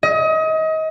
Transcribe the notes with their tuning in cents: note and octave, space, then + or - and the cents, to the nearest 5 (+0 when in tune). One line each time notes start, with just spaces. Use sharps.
D#5 +30